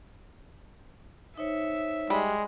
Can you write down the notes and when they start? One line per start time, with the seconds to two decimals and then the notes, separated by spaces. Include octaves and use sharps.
1.38 D#4 C5 C#5 E5
2.10 G3 G#3